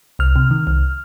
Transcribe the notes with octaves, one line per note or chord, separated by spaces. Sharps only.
C2 F6
C3
D#3
C2